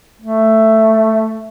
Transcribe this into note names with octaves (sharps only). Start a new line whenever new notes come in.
A3